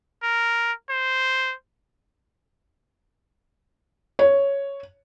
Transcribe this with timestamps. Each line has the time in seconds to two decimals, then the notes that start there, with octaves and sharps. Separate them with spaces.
0.23 A#4
0.90 C5
4.19 C#5